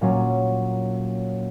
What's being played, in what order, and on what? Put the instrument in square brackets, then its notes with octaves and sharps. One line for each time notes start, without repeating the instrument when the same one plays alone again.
[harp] A#2 F#3 C#4